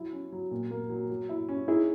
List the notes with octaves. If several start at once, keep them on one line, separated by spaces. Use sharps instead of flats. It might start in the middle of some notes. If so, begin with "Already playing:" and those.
Already playing: F#3 E4
C#4
F#3
A#2
A#3
F#3
F#3
E4
C#4
D#4 E4 G#4